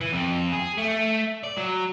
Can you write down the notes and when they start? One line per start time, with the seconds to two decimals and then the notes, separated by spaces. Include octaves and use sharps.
0.01 E3
0.13 F2
0.52 G#4
0.78 A3
1.44 D5
1.57 F#3